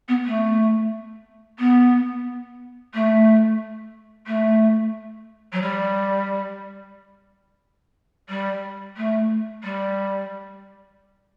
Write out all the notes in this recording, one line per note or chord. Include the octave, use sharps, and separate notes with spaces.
B3
A3
B3
A3
A3
F#3
G3
G3
A3
G3